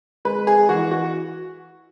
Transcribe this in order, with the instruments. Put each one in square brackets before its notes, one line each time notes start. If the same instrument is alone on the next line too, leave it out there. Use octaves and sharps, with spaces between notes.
[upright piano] G#3 B4
G#4
E3 F#4
F#4